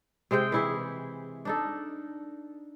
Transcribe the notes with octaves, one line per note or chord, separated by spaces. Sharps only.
C3 G#3 C5 G5
E3 E4 G#4
D4 D#4 A4